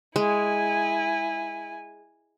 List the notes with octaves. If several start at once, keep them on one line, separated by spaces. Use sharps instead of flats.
G#3 E4 G#5